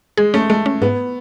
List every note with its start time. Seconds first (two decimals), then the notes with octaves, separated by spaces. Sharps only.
0.17 G#3 G#4
0.34 A3 C#4
0.50 G#3 A3
0.66 C#4
0.82 G#2 B3